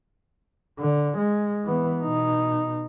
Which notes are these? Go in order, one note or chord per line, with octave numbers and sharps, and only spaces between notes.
D3
G#3
E3 B3
B2 D#4